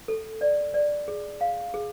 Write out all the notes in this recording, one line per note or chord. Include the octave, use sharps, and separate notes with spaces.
A4
D5
D5
G#4
F5
G#4